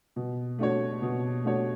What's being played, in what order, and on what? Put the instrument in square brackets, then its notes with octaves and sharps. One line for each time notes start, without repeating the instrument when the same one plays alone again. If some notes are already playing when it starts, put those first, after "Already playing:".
[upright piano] B2
A3 D4 F#4 C#5
B2
A3 D4 F#4 C#5